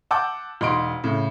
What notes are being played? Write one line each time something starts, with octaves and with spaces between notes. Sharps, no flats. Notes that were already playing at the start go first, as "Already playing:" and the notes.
F#5 A5 D6 E6 G6
E1 D#4 C6 D7
A2 C#3